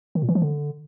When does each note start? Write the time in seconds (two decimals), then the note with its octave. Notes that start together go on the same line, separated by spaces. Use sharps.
0.15 D#3
0.22 A#2
0.29 E3
0.35 F3
0.42 D3